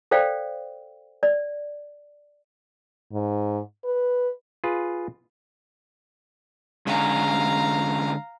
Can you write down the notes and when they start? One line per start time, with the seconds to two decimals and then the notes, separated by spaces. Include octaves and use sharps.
0.11 A4 C5 D5 F5 G5
1.23 D5
3.12 G#2
3.84 B4
4.64 F4 G#4 B4
6.87 D3 G#3 C#4 F5 A#5